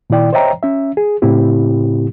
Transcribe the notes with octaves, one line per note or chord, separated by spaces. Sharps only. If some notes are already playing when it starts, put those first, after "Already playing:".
A#2 D#3 E4 D5 G5
C5 C#5 D#5 E5 G5 A#5
C#4 E5
G#4
A2 C#3 C4 E4 G4